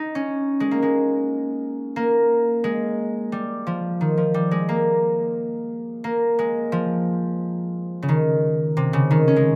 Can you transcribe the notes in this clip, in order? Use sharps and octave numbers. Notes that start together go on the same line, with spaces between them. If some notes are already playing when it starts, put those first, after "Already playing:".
Already playing: D#4
C#4
G#3
A#3
G#3
A#3
G#3
G3
F3
D#3
F3
G3
G#3
A#3
A#3
G#3
F3
C#3
D#3
C3
C#3
D#3
C#4
G#3